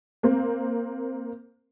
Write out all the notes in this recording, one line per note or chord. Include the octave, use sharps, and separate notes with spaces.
A#3 C4